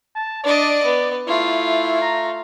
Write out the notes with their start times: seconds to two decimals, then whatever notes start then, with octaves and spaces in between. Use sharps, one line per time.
0.15 A5
0.44 D4 D5 D#5
0.85 B3
1.27 A3 E4 F4
2.02 A#5